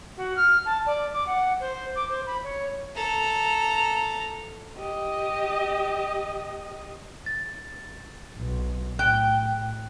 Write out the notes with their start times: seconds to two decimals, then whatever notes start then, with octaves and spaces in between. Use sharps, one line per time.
0.17 F#4
0.36 F6
0.65 A5
0.86 D5
1.13 D6
1.26 F#5
1.60 C5
1.95 D6
2.08 C5
2.26 B5
2.43 C#5
2.95 A4 A#5
4.77 G4 D#5
7.26 A6
8.38 B1
8.99 A2 G5 F#6